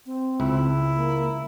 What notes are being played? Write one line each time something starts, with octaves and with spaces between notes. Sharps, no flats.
C4
C#2 E4
A#3